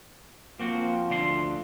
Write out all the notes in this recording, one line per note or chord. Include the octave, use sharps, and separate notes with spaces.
F3 A#3 C4 F#4
D2 D4 C6